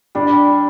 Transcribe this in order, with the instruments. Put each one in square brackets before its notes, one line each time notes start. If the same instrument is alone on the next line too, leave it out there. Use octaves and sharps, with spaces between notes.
[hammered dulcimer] G3 [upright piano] D4